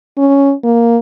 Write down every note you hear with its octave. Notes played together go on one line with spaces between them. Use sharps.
C#4
A#3